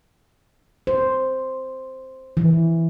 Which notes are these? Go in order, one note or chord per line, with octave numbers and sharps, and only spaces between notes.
C5
E3